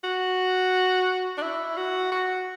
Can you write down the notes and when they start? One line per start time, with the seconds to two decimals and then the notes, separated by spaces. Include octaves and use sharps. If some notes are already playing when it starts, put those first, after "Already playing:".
0.04 F#4
1.37 D4
1.42 E4
1.77 F#4
2.12 F#4